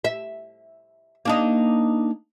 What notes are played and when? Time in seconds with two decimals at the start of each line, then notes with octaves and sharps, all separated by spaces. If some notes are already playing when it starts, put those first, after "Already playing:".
0.04 E5
1.25 A#3 D4 D#4